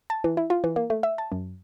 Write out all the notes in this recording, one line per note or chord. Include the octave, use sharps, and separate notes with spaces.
A5
E3
E4
F4
E3
A#3
A3
E5
A5
F#2